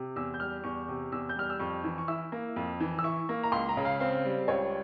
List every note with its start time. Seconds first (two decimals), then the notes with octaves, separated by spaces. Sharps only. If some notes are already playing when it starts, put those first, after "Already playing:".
Already playing: C3
0.16 E2 E6
0.34 G6
0.40 G3 F6
0.64 E2 C#6
0.88 C3
1.12 E2 E6
1.29 G6
1.36 G3 F6
1.50 E6
1.60 F2 C#6
1.84 E3
1.98 C#6
2.08 E4 E6
2.32 A#3
2.56 F2
2.80 E3
2.99 E6
3.04 E4 C#6
3.29 A#3
3.43 A#5
3.52 C#2 C6
3.69 A#5
3.77 C#3
3.85 F5
4.00 C4 F5
4.25 G3
4.48 C#2 C#5